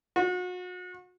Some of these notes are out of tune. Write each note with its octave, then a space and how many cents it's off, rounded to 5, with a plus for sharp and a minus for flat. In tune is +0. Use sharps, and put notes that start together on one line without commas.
F#4 -35